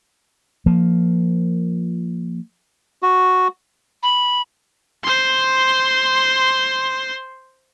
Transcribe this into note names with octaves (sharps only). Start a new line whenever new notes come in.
F3 A#3
F#4
B5
C5 C6